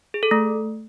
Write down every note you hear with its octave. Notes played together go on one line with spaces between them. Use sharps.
G#4
A4
A3